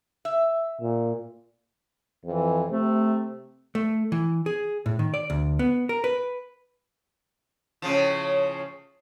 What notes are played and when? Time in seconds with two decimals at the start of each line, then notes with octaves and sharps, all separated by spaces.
0.25 E5
0.81 A#2
2.25 F2 E3
2.70 C3 A3
3.75 A3
4.12 E3
4.46 G#4
4.86 A2
4.99 D#3
5.14 D5
5.30 D2
5.59 B3
5.89 A#4
6.04 B4
7.82 A2 C#3 F3